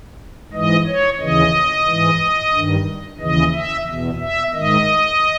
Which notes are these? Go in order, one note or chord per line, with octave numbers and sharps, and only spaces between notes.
G#2 E3 D#5
C#5
D#2 C#3 E3 D#5
G#2 E3
G2 D#3
D#2 C#3 E3 D#5
E5
E2 B2
E5
G#2 D#3 D#5